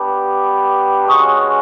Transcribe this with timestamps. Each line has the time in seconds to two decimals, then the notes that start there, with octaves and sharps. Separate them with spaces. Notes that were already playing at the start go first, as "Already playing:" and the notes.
Already playing: B3 D4 G4
1.07 G#3 C#4 F#4 C#6 D#6